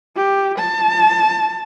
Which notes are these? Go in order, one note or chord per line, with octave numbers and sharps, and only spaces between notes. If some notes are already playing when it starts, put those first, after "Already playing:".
G4
A5